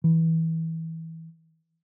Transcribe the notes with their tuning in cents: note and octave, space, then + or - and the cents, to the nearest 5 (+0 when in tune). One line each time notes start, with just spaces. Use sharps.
E3 -20